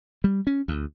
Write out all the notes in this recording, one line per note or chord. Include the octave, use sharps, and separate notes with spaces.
G3
C#4
D2